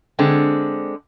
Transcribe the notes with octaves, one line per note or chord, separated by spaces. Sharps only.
D3 G#3 C4